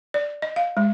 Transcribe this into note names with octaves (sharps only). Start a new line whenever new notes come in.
D5
D#5
F5
G#3